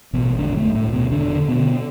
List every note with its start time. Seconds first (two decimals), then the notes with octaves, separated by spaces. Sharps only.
0.13 A1 B2 B3
0.38 E1 D3 D4
0.56 A2 A3
0.63 E1
0.75 A2 A3
0.87 D2
0.93 B2 B3
1.11 E1 D3 D4
1.35 D3
1.48 B2 B3
1.60 D3